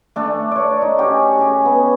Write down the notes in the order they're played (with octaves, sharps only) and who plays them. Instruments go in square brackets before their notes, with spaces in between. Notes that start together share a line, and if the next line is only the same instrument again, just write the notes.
[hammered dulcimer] A3 D4 A4
C#5 D5
D#4
C#4 F#4 G4
G4 G#4
B3